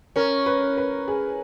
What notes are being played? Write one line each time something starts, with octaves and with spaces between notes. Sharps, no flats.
C#4 A#4
B4
B4
G#4